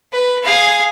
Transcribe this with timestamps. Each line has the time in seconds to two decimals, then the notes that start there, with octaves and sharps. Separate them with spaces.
0.12 B4
0.43 G#4 F5